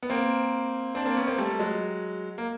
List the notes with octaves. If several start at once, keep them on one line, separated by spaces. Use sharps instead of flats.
B3
A#3 C4
C4 D4
A#3 C4
B3 C#4
A#3 C4
G3 A3
F#3 G#3
A#3